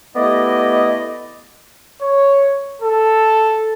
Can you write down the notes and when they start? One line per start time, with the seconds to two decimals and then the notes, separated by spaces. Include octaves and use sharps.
0.16 A3 B3 E4 G4 D5 D#5
2.02 C#5
2.82 A4